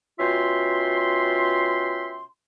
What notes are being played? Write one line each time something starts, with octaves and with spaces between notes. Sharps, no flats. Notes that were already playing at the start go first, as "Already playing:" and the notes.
B2 C#4 F4 E5 G5 C6